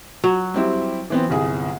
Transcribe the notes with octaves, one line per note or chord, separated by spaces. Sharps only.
F#3
G3 C4 E4
E3 B3 C4
G1 C2 G#4